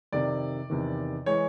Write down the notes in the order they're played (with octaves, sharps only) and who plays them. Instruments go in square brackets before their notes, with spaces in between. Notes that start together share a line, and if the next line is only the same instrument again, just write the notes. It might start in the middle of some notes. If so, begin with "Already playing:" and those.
[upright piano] F2 C3 D#3 D5
E2 C3 D#3
E3 G#3 C#5